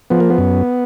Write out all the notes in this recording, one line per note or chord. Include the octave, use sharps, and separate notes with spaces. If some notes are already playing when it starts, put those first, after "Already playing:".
F3 B3
A#3
B3
F#2